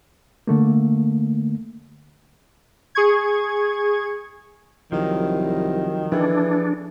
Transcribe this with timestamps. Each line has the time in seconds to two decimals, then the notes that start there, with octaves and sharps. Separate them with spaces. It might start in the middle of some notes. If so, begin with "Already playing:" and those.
0.47 D3 A3 A#3
2.95 G#4 C#6 G#6
4.92 C2 D#3 F3 F#3
6.12 E3 F3 D4 G#4 A4